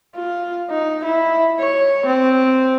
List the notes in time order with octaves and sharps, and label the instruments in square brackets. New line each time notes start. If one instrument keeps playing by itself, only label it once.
[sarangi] F4
D#4
E4
C#5
C4